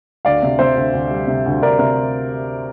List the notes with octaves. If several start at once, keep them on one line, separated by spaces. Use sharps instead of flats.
D2 D5 F5
C3
C3 C5 E5
D2
D2
G3
C3
D2
D2 A#4 D5
C3 A#4